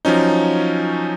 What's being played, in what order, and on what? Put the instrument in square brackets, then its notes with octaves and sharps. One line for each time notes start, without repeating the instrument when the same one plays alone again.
[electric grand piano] F3 F#3 C#4 D#4